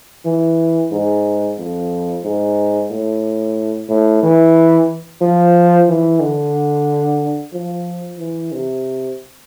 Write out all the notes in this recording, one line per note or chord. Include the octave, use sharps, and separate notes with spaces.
E3
G#2
F2
G#2
A2
A2
E3
F3
E3
D3
F3
E3
C3